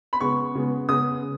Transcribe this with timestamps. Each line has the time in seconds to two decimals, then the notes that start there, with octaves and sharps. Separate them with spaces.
0.13 B5
0.20 C#3 G#3 B3 C#6
0.55 C#3 G#3 B3
0.89 C#3 G#3 B3 D#6